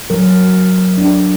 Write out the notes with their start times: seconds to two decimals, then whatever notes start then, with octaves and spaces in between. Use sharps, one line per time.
0.10 F#3 A#4
0.98 D4